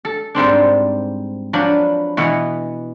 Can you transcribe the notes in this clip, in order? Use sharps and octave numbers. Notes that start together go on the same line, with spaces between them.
A4
G#2 G3 C4 D4
F3 F#3 D4 B4 B5
B2 E3 B3